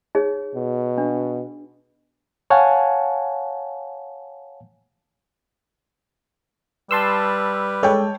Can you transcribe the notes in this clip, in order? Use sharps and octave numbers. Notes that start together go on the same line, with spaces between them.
D#4 G#4 C#5
B2
D4
C#5 F5 F#5 G#5 A5
G3 B4 A5 C6 E6
G#3 A4 C#5 G5